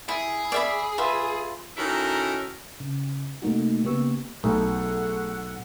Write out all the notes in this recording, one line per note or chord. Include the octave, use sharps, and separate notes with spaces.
E4 G#4
D5 E5 B5
F4 B4 E5
D#3 C#4 E4 F#4 A4 A#4
C#3
C3 A3 A#3 D#4 F#4
C#3 A#3 B3 G4 C#6 E6
B1 A3 G#4 A4 F#5